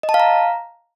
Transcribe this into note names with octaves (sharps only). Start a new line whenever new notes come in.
D#5
A5
F5
A#5